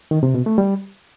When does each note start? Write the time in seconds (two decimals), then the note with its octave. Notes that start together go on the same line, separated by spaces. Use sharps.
0.11 D#3
0.23 C3
0.35 B2
0.46 A3
0.58 G3